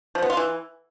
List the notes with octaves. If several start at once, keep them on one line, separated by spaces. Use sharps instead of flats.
F3
B3
F4
E3